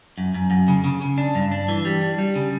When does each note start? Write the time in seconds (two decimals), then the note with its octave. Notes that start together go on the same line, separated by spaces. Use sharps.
0.18 F#2
0.34 F#2
0.51 F#2
0.68 C#3
0.84 C#3
1.02 C#3
1.18 D4
1.35 G2
1.52 D4
1.68 E3
1.85 G3
2.01 D4
2.18 G3
2.35 C#3